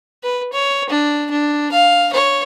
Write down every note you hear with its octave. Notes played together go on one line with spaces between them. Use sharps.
B4
C#5
D4
D4
F5
C#5